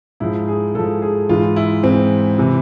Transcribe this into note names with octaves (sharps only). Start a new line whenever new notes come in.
G#2 F3 E4
G#4
G#2 F3 A4
G#4
G#2 E3 F4
E4
G#2 E3 C4
C3 E3